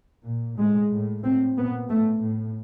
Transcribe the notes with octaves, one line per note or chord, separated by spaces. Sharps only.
A#2
A2 G#3
A2
A2 C4
A#2 B3
A2 A3
A2